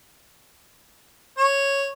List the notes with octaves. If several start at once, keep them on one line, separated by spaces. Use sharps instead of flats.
C#5